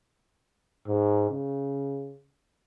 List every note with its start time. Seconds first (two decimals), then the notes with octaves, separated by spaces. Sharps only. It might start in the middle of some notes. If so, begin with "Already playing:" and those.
0.87 G#2
1.30 C#3